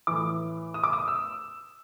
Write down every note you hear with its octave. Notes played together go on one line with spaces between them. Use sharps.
A2 E3 D6
D#6
D6
D#6
E6